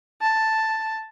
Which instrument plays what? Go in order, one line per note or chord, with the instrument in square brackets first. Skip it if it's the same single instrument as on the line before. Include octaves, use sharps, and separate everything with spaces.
[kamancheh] A5